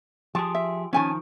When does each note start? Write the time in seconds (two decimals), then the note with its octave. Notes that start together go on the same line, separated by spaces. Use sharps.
0.35 F3 G4 G#4 A5
0.55 E5
0.93 D#3 F3 C#4 G#5 A5